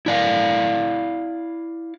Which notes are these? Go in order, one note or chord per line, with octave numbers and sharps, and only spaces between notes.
E4 D5 F5